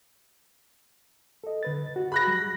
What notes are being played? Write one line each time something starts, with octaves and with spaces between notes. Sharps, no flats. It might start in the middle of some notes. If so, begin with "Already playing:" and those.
A4 D#5
D3 B4 A6
F#4
G#4 B5 F#6 A#6
F#3 G3